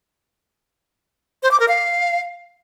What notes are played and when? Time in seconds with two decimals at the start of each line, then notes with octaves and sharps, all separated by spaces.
1.43 C5
1.51 D6
1.60 A#4
1.68 F5